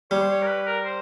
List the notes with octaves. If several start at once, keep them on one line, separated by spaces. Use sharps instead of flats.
G3 C#5
C5
C#5
A#4
B4
A#4
C5